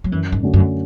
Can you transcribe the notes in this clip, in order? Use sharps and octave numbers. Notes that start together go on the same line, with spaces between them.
F#3
F#2 E3
G#2
D3 A3 C#4 F#4
F#2